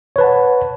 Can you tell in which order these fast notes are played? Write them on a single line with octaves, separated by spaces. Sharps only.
C#5 B4 A5 F#5